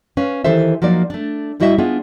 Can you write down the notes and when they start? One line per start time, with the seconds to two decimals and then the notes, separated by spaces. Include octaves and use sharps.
0.17 C#4 B4 F5
0.44 D#3 E3 G4 A4 C5 E5
0.82 F3 F#3 A#3 D#4 D5
1.10 A3 D4
1.60 A2 G3 E4 F#4 D#5 E5
1.78 B3 D4 F4 G#4